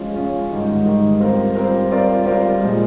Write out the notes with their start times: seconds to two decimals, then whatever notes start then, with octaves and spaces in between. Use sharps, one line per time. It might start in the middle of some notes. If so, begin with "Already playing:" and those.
Already playing: F3 G#3 C#4 F4
0.16 F3 G#3 C#4 F4
0.51 G#2 D#3 G3
0.85 G#2 D#3 G3
1.20 G3 C4 F4 A#4
1.55 G3 C4 F4 A#4
1.90 G3 C4 F4 A#4 D5
2.25 G3 C4 F4 A#4 D5
2.60 A#2 F3 G#3